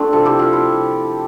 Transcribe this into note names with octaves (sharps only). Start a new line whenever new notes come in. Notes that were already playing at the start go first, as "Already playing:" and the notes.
Already playing: F3 A3 C4 D4
C3 F4 A4
E4 G4
F3 F4 A4
C4 E4
C3
F3